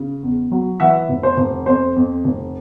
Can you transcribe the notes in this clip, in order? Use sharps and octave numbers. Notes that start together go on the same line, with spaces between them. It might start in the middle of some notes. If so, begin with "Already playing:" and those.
Already playing: C#3
E2
F#3
E3 E5 F#5
F1
C5
F1
F2 C5
F2
F1